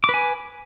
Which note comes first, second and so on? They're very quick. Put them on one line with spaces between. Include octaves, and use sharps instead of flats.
D6 B4 G#5